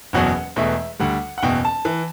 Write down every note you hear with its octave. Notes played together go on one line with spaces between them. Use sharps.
F#1 E2 B2 F#3 F#5
E1 E2 B2 A3 E5
D2 D3 G3 F#5
F#5
F#1 E2 B2 G5
A5
E3